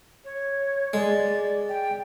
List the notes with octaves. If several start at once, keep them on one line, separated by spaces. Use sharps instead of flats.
C#5
G#3 D5
G5